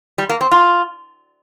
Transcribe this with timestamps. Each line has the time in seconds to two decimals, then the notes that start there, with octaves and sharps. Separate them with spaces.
0.18 G3
0.29 A#3
0.41 C4
0.52 F4